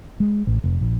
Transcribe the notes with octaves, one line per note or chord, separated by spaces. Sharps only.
G#3
A1
F1
A#1